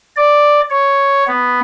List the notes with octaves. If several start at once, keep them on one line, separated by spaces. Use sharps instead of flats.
D5
C#5
B3